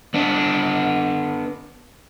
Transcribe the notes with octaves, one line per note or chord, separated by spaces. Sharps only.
B3 D4